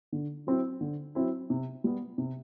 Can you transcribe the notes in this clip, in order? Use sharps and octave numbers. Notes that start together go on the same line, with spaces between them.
D3
F#3 C4 E4
D3
F#3 C4 E4
C3
G3 B3
C3